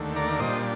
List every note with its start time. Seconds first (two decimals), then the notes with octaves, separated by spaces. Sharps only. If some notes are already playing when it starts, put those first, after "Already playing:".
Already playing: D#2 D3 A3
0.16 A#4 D5
0.39 A#2 G3 D4 C5 D#5